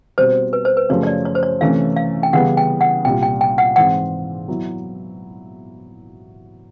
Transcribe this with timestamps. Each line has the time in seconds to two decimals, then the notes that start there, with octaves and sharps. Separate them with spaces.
0.18 B2 G3 C4 C5
0.53 B4
0.65 C5
0.77 B4
0.89 F#2 C#3 F3 A3 C#4 C#5
1.03 C#5
1.07 D5
1.25 C#5
1.35 C5
1.43 C#5
1.61 C3 E3 A3 C#4 F5
1.96 F5
2.23 G5
2.33 C#3 E3 G3 B3 F#5
2.57 G5
2.81 F#5
3.05 C2 A#2 G3 G5
3.23 G5
3.41 G5
3.58 F#5
3.76 G#2 E3 G#3 C4 F#5
4.48 F#3 B3 E4